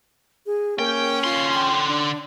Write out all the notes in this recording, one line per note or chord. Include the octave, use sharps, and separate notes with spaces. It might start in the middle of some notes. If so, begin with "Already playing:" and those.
G#4
A#3 C#4 G5
D3 F4 C6
G5
D4